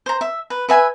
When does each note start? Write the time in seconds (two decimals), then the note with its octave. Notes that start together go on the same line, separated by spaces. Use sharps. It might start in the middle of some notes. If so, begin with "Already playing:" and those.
0.06 C5 A#5
0.21 E5
0.50 B4
0.69 B4 E5 G#5